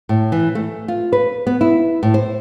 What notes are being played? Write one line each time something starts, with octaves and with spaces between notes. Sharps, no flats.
A2
E3
A3
F4
B4
B3
E4
A2
C5